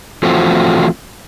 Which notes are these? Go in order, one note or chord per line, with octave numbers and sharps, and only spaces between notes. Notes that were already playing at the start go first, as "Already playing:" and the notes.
E3 F3 A3 C4 F4 F#4